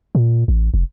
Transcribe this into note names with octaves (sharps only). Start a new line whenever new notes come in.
A#2
A1
F1